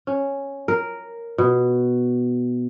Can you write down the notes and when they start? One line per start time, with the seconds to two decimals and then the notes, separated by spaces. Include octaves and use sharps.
0.07 C#4
0.68 A#4
1.38 B2